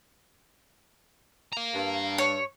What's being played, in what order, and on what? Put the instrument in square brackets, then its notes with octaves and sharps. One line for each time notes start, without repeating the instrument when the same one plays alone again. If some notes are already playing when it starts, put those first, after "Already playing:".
[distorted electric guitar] F5 A#5
[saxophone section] G2
[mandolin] C#5